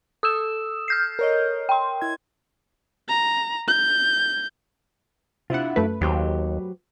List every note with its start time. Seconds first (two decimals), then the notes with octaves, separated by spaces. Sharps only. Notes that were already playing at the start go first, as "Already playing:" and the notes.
0.23 A4 D#6 E6 E7
0.88 F6 G6 C7
1.19 A#4 C#5 D#5
1.69 G5 C6
2.01 E4 G#6
3.09 A#5
3.68 G6
5.50 C3 D4 E4 F4 F#5
5.76 F#2 A3 B4
6.01 D#2 F#3 G4 C5